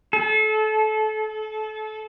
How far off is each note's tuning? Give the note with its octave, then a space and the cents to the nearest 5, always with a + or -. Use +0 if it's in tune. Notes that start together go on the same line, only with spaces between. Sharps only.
A4 -30